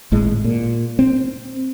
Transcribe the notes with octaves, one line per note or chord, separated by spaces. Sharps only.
G#1 A2 G#3
A#2
C4